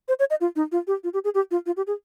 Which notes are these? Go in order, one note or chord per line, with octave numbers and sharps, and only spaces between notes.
C5
C#5
D#5
F4
D#4
F4
G4
F4
G4
G#4
G4
F4
F4
G4
G#4